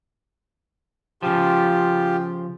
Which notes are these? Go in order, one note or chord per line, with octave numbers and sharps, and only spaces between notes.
C#3 F3 F4 G4